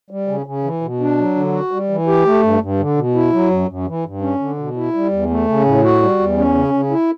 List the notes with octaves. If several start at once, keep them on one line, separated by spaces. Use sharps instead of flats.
G3
C#3
C#3
E3
B2
D4
F#3
D3
F#4
G3
E3
G4
A3
G2
G2
D3
B2
E4
F#3
F#2
F#2
E3
G2
C#4
D3
B2
E4
G3
E2
A3
C#3
A2
F#4
G3
E2
C#4
C#3
C#3
E4